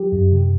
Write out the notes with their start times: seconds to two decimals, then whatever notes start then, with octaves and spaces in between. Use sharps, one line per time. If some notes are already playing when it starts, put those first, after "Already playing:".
Already playing: F#3 G4
0.12 F#2
0.32 C3